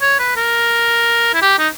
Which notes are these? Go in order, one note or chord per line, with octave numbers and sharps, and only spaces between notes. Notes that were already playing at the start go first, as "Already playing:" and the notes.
C#5
B4
A#4
E4
G4
D#4